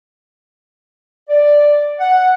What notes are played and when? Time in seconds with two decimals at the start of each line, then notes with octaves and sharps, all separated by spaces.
1.30 D5
2.00 F#5